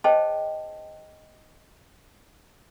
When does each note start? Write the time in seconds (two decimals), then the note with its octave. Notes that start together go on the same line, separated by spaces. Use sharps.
0.04 G#4 C5 C#5 D#5 G5 A5